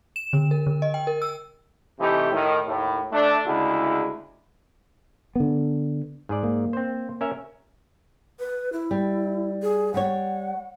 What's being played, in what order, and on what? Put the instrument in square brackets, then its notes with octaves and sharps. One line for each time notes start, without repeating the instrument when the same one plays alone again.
[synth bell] E7
D3
A#4
D3
D#5
G5
A#4
E6
[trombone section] C3 E3 A3 D#4 G4
A2 D#3
D#2 A2
A3 D4
D2 C#3 G#3 E4
[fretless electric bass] D3 B3
[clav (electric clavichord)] G#2 G#4 D5
[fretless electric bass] A#3
[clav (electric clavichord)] C4 C5
C#4 A#4 E5
[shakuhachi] B4
E4
[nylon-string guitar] G3
[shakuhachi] G#4
[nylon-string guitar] G3 C#5 [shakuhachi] F#5